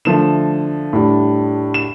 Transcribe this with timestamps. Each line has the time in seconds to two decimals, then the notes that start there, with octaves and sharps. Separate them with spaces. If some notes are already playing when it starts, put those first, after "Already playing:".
0.05 D3 F3 A3 E7
0.93 A2 G3 D4
1.74 E7